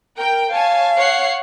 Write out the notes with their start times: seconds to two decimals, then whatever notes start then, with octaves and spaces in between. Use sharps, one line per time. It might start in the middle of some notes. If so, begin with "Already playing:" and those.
0.16 A#4 G5
0.52 C#5 F5 G#5 A5
0.97 C#5 F#5 C7